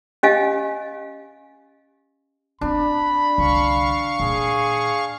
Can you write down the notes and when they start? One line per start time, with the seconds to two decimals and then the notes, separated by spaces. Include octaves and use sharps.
0.23 C#4 G4 D#5 F5 G#5
2.61 B3 C4 D4 B5
3.38 C2 D3 F5 C#6
4.20 A#2 D#3 G#4